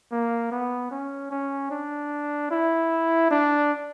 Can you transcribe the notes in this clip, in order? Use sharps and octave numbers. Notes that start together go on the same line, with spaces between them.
A#3
B3
C#4
C#4
D4
E4
D4